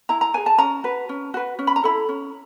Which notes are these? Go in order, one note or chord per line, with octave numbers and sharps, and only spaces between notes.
E4 A#5
A#5
G#4 B4 G#5
A5
C#4 A#5
F#4 B4
C#4
F#4 B4
C#4
B5
A#5
E4 A4 B5
C#4